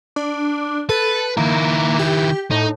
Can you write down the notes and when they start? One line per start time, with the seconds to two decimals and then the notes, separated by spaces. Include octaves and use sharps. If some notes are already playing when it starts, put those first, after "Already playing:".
0.16 D4
0.89 A4 B4
1.37 D#3 A#3 E4
1.99 G4
2.51 A2 D#4